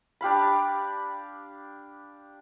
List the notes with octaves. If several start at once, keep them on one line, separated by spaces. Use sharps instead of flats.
D4 G4 F5 B5